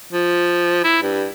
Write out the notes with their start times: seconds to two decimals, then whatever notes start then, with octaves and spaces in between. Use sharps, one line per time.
0.13 F3
0.84 E4
1.02 G2